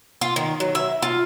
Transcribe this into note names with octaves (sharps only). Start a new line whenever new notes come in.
F4
D#3
F#3
E5
F4